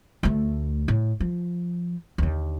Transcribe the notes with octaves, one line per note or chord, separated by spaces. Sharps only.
D2 A3
A2
F3
D#2 D3